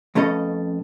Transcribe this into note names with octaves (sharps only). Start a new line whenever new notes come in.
F2 B2 A3 C#4 A4 D#5